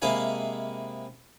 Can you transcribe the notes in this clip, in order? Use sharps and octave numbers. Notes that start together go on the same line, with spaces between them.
C3 G#3 A#3 E4 F5 G#5